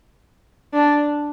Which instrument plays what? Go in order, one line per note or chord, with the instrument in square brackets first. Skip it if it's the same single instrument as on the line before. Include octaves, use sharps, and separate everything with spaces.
[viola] D4